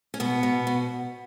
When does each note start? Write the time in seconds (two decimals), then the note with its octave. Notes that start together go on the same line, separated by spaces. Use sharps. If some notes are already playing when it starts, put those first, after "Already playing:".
0.14 C#4
0.20 B2 B3
0.43 B2
0.67 B2